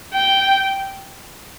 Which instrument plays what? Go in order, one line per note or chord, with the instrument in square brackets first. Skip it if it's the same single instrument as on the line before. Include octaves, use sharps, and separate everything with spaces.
[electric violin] G5